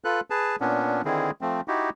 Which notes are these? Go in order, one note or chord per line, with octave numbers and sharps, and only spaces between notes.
F4 A4 B4 F#6
G#4 B4 A5
A#2 B3 C#4 D4
D3 D#3 C4 E4 G#4
F3 A3 C4
D#4 E4 F#4 G4